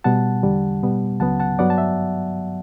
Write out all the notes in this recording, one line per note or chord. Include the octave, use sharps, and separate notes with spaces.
B2 G3 B3 F#5 A5
E2 D3 G3
B2 G3 B3
C#2 C#3 F#3 B3 F#5 A5
F#5 A5
G2 F#3 B3 D5 F#5
A5
E5